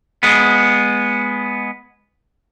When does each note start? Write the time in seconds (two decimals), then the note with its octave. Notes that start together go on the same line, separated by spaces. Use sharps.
0.23 G#3 B3